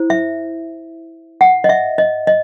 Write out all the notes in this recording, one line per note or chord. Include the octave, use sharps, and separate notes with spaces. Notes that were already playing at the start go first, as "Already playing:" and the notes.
Already playing: E4 C5
E5
F#5
D#5
E5
D#5
D#5